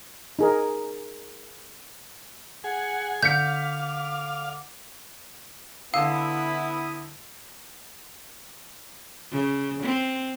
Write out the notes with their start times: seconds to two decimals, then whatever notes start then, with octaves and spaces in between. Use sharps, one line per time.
0.39 D#4 G#4 A#4
2.64 G#4 F#5
3.23 D3 F5 D6 G6 B6 C#7
5.94 D3 B3 E4 F5 D#6 E6
9.31 C#3
9.83 C4